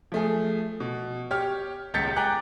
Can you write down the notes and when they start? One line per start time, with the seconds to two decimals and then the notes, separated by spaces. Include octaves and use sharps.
0.12 F3 A3 G#4
0.80 B2
1.31 G4 C#5 F6
1.94 D#1 C#2 G6 A6 B6 C#7
2.16 G5 G#5 A#5 D6 F#6